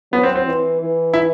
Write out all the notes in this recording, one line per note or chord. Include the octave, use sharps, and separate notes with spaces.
F#3 B3
C4
C4
E3
E3
E4